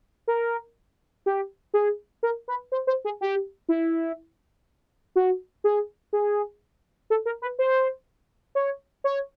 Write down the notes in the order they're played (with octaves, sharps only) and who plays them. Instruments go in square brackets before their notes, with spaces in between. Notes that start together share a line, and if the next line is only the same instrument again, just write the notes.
[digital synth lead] A#4
G4
G#4
A#4
B4
C5
C5
G#4
G4
E4
F#4
G#4
G#4
A4
A#4
B4
C5
C#5
C#5